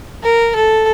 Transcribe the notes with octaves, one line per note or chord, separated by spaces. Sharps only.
A#4
A4